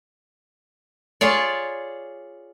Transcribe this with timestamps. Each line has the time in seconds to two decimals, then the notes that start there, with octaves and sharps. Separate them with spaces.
1.21 F4 G#4 C#5 D5